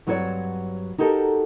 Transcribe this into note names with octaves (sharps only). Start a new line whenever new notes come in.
G2 F#3 C4 F#4 C#5 D5
D#4 F#4 G4 A4 A#4